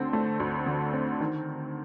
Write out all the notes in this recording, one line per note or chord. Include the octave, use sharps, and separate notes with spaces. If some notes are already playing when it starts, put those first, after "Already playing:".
Already playing: D2 D3 C4
A3
D2
D3
C4
D#3